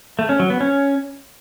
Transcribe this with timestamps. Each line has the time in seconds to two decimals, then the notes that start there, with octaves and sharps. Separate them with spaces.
0.19 A3
0.29 C#4
0.40 F#3
0.50 B3
0.60 C#4